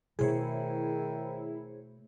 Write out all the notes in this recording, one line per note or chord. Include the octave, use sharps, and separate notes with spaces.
B2 D#3 A3 E4 G#4 C5 C#5